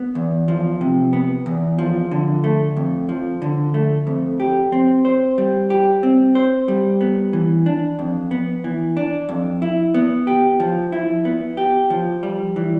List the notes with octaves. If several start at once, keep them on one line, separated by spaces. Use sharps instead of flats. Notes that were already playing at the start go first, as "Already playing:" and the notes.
Already playing: B3
E2
F3
C3
B3
E2
F3
D3
A3
F2
F3
D3
A3
F2
G4
C4
C5
G3
G4
C4
C5
G3
B3
E3
D4
F2
B3
E3
D4
F2
E4
B3
G4
F3
E4
B3
G4
F3
G3
E3